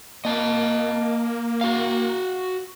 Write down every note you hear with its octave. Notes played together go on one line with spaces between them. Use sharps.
A#3 D#5 A5
F#4 F5